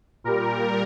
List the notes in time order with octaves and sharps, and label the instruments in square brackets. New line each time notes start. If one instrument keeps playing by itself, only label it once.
[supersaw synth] A#2 G3 A#4